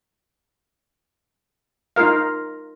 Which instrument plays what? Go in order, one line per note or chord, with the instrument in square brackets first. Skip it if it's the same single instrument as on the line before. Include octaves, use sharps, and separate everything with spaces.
[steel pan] D#4 F4 A#4 F5